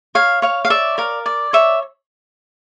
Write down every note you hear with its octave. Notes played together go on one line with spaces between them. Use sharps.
C#5 F5
C#5 F5
F5
D5 E5
A#4 F5
D5
C#5 E5